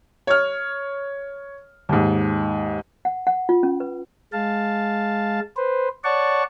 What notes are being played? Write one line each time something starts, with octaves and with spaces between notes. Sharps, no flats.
C#5 F6
D#2 G#2
F#5
F#5
F4
C#4
B4
G#3 F5 A5
B4 C5
C#5 D5 F#5 A5 C#6